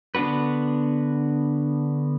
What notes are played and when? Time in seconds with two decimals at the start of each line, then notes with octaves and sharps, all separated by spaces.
0.15 D3 B3 D4 F#4 B4